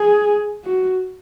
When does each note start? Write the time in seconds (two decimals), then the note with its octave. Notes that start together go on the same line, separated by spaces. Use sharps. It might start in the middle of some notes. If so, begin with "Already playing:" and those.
Already playing: G#4
0.64 F#4